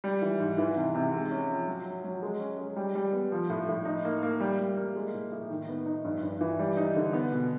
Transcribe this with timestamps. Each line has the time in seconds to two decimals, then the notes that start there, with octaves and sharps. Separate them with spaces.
0.04 G3
0.22 E3
0.40 G#2
0.58 E3
0.77 C3
0.95 C3
1.14 G#3
1.31 C#4
1.49 F3
1.67 F#3
1.85 F#3
2.04 F#3
2.23 G#3
2.40 C#4
2.58 G#3
2.76 G3
2.95 G3
3.13 B3
3.32 F3
3.50 A2
3.68 A2
3.85 D#4
4.05 A#3
4.23 A#3
4.40 G3
4.60 G3
4.77 A#3
4.96 G#3
5.14 A2
5.32 A2
5.50 D#3
5.68 B3
5.86 D#4
6.05 G2
6.23 G2
6.41 E3
6.59 G3
6.77 D#4
6.96 D3
7.13 B3
7.32 B2